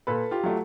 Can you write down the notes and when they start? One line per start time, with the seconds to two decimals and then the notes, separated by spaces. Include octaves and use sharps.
0.07 A#2 A4 B4
0.31 F4 G4
0.43 F#3 A3